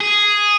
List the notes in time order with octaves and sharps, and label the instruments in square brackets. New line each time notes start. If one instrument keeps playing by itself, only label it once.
[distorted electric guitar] G#4